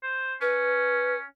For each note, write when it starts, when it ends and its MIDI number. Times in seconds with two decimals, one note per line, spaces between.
0.03 0.34 72
0.41 1.24 61
0.41 1.15 71